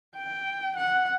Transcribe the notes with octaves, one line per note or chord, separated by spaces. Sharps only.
G5
F#5